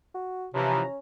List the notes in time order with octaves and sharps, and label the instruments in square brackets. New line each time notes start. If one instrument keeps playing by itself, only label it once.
[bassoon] F#4
[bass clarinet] C3 [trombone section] E3 F3 [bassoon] C#4 [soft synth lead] A#5